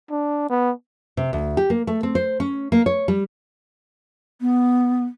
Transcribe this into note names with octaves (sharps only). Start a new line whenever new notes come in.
D4
B3
C3
D2
G4
A#3
A3
C4
C5
C#4
A#3
C#5
G3
B3